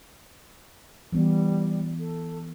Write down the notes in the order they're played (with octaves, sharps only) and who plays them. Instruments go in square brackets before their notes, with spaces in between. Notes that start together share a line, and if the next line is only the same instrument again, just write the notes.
[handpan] E3 B3 [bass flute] G3
[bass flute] A4